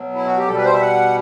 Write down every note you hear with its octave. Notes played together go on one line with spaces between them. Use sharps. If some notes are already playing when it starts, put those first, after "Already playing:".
Already playing: B2 F#3
E4
F#4
G4
B2 G3 A4
B4
C5
E5
F#5